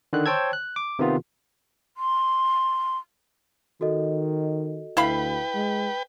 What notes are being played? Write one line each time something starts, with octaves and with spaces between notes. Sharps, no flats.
D3 D#3 F#6
C5 C#5 G5 A5 E6 G#6
F#6
D6
C3 D#3 B3 F4
C6
D#3 F#4 A4 D#5
D2 E4 B4 F5 G5 B5
G#3